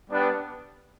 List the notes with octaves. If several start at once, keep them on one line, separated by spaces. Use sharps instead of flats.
G3 B3 D4